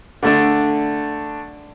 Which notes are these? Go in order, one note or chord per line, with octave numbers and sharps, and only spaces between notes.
D3 A3 D4